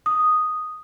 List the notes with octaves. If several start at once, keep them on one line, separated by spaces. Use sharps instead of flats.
D#6